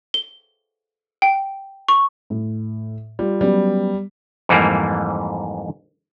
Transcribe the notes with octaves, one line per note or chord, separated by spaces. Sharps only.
G7
G5
C#6
A2
G3 F4
F#3 G3 B3 C#4
F2 G#2 E3 G3 A#3